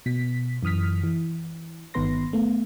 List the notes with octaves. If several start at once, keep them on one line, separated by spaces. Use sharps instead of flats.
B2 B6
F#2 E3 D#6 F6 B6
E3
G1 D#3 B3 B4 C6 A#6
A3 B3